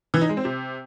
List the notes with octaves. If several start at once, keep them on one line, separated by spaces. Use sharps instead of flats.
E3
D#4
G#3
C4
C3